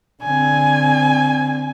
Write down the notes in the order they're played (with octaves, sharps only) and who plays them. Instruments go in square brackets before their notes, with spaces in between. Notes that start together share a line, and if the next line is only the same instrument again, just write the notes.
[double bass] D3 C4 [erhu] G#5